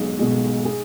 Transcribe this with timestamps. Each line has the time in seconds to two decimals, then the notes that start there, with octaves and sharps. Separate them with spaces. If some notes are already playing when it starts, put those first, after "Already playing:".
Already playing: B1 B2 G#3 G#4
0.19 B2 G#3
0.65 G#4